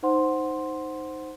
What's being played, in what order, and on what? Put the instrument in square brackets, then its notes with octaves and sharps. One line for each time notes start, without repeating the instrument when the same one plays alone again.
[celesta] D#4 C5 F#5 C6